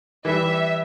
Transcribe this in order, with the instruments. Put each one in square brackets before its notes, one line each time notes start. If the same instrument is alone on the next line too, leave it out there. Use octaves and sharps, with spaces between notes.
[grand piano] E3 G3 [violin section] E5